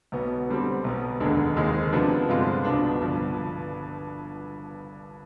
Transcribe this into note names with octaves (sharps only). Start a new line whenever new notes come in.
B1 B2 B3
D3 G3 C4
B1 B2 B3
F1 D#2 D3 G#3 D4
D#2 D#3 G#3 C4 D#4
C3 F3 B3 D4
G2 D3 G#3 C4 F4
C2 B2 B3 D4
G1 G2 F3